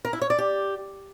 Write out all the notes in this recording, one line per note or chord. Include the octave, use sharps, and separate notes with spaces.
A#4
E4
C#5
D5
G4